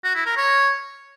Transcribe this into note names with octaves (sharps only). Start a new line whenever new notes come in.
F#4
E4
A#4
C#5